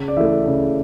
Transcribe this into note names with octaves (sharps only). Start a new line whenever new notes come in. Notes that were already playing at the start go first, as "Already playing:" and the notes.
Already playing: C#3
D5
E3 A3 E5
C#3